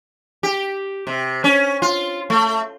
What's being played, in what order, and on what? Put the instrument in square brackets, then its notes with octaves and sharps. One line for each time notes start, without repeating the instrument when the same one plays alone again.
[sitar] G4
C3
C#4
F4
A3